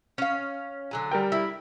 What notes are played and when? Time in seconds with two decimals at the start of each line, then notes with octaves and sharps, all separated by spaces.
0.18 C#4 F5
0.91 D3 F#3 G#5
1.11 G3 A#4 G5
1.32 E4